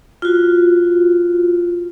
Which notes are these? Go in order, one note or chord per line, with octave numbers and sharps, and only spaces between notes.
F4 F#4